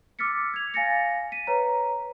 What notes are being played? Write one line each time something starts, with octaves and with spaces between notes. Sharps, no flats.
D6 E6 F6 A6 B6 C#7
G#6 F7
F5 G#5 A6 A#6 C#7
B6 D#7
B4 C#5 A#5